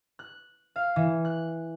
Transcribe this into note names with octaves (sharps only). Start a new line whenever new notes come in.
F#6
F5
E3
F#6